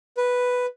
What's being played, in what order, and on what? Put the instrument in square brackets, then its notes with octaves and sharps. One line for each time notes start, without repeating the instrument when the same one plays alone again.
[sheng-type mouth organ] B4